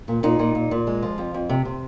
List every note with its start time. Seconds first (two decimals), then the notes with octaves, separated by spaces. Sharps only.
0.08 A#2
0.23 A#2 D#4
0.39 A#2
0.55 A#2
0.71 A#2
0.87 G#3
1.03 F3
1.18 F2
1.34 F2
1.49 C3
1.65 C3